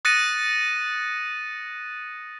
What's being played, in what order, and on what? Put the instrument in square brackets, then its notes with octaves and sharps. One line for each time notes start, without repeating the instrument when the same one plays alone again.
[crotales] D#6 F#6 A6 A#6 C#7 D#7